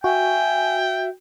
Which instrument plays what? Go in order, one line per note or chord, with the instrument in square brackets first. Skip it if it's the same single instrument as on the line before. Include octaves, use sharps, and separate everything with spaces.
[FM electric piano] F#4 [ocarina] E5 [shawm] G5 [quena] G#5